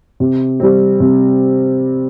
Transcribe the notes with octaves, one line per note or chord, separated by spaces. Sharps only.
C3
G3 C4
C3